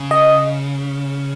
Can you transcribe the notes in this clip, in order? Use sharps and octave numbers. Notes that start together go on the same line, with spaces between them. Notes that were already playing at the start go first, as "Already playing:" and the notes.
Already playing: C#3
D#5